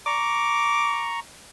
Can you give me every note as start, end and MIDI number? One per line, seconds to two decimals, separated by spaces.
0.06 1.20 82
0.06 1.20 85
0.06 1.13 86